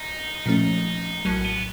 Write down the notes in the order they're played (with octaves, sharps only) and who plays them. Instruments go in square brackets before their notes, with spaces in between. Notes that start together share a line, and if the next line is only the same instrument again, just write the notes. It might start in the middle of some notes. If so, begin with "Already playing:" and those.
Already playing: [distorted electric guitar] D#4
[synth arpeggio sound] A#2 F3 A3 C#4
[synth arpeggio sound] A#1 A2 F#3 [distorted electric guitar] C#4
[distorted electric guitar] B3